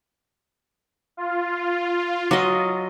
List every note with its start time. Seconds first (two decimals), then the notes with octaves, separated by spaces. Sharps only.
1.17 F4
2.31 F#3 D#5